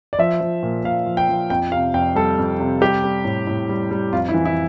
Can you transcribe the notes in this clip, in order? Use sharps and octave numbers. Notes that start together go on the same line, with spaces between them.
D5
F3 E5
F3
A#2
A#2 F5
F3
G5
F3
F2 G5
C3 F5
F2 G5
G3 A4
F2
C3
G3 G4
G3
A2
A2
G3
G3
F2 F4
E4
E3
E4